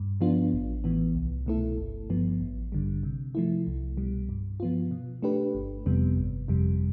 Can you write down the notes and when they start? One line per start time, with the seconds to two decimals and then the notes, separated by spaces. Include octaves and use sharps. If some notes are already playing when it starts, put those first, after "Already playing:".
Already playing: G2
0.21 F3 B3 D4 F4
0.53 A1
0.84 A2 E3 B3
1.15 C2
1.46 B2 A3 E4 A4
1.78 G1
2.10 G2 F3 B3
2.41 A1
2.72 G2 D3 G3
3.03 C3
3.35 F3 A3 E4
3.67 C2
3.97 B2 G3
4.29 G2
4.60 F3 B3 F4
4.91 B2
5.22 A3 D4 G4 B4
5.55 G1
5.86 F2 C3 G3 B3
6.17 G1
6.48 F2 C3 G3